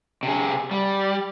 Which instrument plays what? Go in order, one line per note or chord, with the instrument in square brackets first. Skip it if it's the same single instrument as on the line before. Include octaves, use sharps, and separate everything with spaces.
[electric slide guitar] C3 G#4
G3